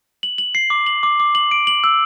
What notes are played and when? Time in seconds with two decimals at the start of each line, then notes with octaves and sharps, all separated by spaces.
0.23 F#7
0.38 F#7
0.55 C7
0.70 D6
0.86 F#7
1.03 D6
1.20 D6
1.35 F#7
1.51 D7
1.67 F#7
1.84 E6